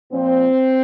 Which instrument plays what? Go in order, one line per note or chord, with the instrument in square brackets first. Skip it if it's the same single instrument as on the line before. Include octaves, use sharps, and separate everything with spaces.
[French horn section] A#2 F3 C4